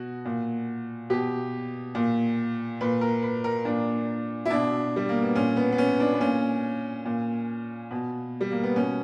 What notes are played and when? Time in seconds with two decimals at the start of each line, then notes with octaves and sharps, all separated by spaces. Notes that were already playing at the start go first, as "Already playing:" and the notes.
Already playing: B2 F#4
0.25 A#2
1.10 B2 G4
1.95 A#2
2.81 A#2 B4
3.01 A#4
3.23 B4
3.44 A#4
3.65 A#2 D4
4.45 E4
4.50 B2 D4
4.96 G3
5.09 A#3
5.22 B3
5.35 A#2 C#4
5.57 B3
5.72 B3
5.78 C#4
6.00 D4
6.13 B3
6.20 A#2 C#4
7.05 A#2
7.91 B2
8.41 G3
8.51 A#3
8.64 B3
8.76 B2 C#4